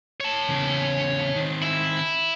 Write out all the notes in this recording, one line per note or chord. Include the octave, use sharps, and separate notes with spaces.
C#5 A5
E2 C#3
D#3 C4
E4